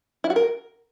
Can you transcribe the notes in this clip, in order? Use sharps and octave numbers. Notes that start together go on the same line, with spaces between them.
E4
F#4
A#4